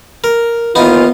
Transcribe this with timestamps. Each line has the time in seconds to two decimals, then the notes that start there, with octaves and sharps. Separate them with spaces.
0.24 A#4
0.75 D#2 E3 B3 D#4 F4